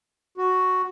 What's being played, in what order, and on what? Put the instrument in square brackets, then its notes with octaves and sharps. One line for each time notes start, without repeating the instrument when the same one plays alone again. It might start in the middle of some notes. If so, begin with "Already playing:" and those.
[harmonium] F#4